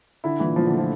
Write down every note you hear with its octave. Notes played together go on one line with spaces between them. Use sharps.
D3 E4
A#2 E3
A#2 F3
D3
A3
F3